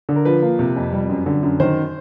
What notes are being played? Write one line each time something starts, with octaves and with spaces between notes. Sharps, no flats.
D3
A#4
F3 B4
A#3
C3
F2
G3
F#2
D3
F#2
D#3 C5